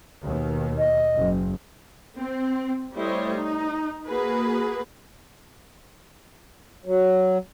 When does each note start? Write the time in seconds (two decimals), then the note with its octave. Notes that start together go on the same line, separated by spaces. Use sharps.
0.23 D#2 B2 D#3
0.78 D#5
1.15 F#1
2.18 C4
2.95 G3 A3 E4 C5 C#5 D#5
3.37 D#4
4.06 A#3 F#4 G#4 B4
6.86 F#3